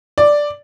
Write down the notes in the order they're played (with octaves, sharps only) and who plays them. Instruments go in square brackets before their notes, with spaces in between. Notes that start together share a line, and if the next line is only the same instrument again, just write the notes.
[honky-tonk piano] D5